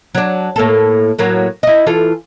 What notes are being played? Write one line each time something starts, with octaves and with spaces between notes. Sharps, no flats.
F#3 D4
A2 A#3 A4
A2 F#3 A#3
E4 D#5
E3 F4 A4